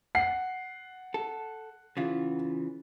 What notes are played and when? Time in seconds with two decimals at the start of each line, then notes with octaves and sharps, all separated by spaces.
0.15 F#5 C7
1.14 A4
1.97 C#3 E3 F4